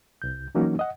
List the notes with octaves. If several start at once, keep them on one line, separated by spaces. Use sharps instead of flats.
C2 G6
E3 F#3 A#3 C#4 D#4 F#4
D#5 F#5